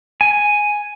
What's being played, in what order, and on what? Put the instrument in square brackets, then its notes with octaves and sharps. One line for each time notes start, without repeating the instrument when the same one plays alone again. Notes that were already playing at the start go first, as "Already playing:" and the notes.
[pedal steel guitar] G#5